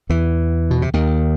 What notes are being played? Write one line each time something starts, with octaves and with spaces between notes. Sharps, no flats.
E2 E3
B2
C3
D#2 D#3